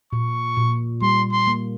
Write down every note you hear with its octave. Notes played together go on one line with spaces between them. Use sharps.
A#2 C#6
A#2
G3 C6
C6
A#3